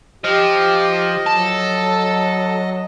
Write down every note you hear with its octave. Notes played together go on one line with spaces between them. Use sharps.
F3 G4 D#5
F#3 A4